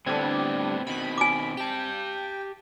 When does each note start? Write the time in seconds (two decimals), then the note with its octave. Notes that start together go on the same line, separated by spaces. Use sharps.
0.06 A2 D3 G3 B3 C4 D4 G#6
0.87 B2 D#3 B5
1.18 G#5 D6
1.57 G4 G5 A5